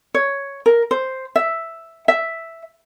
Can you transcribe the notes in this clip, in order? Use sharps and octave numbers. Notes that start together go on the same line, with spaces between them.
C#5
A#4
C5
E5
E5